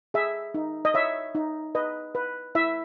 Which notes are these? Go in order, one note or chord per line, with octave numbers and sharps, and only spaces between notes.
G#4 E5
D#4
D#5
C#5 E5
D#4
B4 D#5
B4
E4 E5